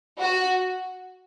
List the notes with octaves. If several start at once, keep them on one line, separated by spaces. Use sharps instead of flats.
F#4